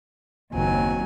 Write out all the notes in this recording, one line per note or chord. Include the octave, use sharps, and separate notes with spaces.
F#1 D#2 F#3 C4 G#5